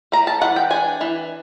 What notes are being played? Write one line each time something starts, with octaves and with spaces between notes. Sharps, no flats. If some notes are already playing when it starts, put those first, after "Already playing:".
A3 A#5
A5
E3 F#5
G5
D4 G#5
E3